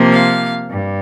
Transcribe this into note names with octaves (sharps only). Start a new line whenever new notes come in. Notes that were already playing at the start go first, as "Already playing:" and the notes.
Already playing: C3 F3 A#3
F5
G2